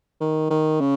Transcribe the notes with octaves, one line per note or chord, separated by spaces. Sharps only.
D#3
D#3
C#3